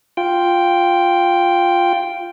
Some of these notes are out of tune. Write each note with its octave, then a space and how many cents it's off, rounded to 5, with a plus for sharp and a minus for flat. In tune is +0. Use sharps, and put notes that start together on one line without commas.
F4 +0 G5 +0